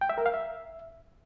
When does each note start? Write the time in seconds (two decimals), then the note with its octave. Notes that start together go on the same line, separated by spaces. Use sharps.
0.01 G5
0.10 E5
0.18 A#4
0.26 F5
0.34 E5